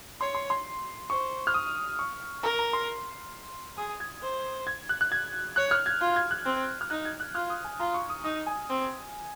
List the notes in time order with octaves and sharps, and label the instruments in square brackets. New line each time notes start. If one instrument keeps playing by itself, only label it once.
[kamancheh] C#5 [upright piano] C6
[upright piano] C6
C6
[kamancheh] C5 [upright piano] C#6
[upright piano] F6
D#6
C#6
[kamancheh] A#4 [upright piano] A#5
[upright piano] A#5
C6
[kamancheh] G#4 [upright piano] D#6
[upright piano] G#6
[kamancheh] C5
[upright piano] G#6
F#6
F#6
G#6
[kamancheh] C#5 [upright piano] F#6
[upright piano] F6
G#6
[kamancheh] F4
[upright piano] G#6
F#6
[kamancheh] C4
[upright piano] F6
[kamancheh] D#4 [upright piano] F#6
[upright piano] G#6
F#6
[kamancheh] F4 [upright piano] F6
[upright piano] D#6
G#5
[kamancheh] F4 [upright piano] A#5
[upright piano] C#6
D#6
[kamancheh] D#4 [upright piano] D#6
[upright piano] G#5
[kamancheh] C4